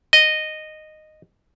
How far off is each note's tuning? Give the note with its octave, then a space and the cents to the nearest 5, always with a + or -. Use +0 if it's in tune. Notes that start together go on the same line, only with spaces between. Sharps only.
D#5 -10